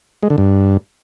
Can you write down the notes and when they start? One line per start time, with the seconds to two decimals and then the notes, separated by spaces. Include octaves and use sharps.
0.23 G#3
0.30 D3
0.38 G2